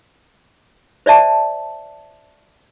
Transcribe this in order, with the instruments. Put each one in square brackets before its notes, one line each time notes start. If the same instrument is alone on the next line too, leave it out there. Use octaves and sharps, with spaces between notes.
[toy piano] C5 D5 E5 A5